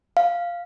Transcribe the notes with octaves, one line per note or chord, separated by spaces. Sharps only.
F5